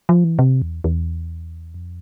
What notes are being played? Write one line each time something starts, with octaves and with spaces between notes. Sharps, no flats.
F3
E3
C3
E2
E2
F2